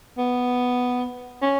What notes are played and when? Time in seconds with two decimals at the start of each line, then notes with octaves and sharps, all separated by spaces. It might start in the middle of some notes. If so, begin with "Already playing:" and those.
0.18 B3
1.42 C#4